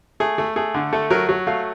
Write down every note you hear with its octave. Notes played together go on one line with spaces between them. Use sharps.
A3 G#4
A3
A3 G#4
D3
A3 A4
F#3 A#4
F#3
A3 F5